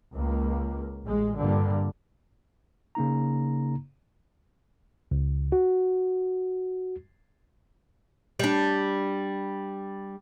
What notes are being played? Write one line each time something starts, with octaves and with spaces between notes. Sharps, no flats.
C#2 A#3
A1 G#3
G2 A#2 D3
C#3 A#3 D#4 A#5
C#2
F#4
G3 D4